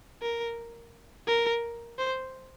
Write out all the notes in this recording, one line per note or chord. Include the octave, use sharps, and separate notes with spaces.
A#4
A#4
C5